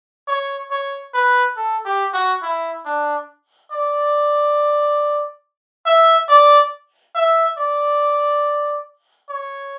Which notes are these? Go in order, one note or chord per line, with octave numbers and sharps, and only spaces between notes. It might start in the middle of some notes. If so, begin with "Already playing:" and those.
C#5
C#5
B4
A4
G4
F#4
E4
D4
D5
E5
D5
E5
D5
C#5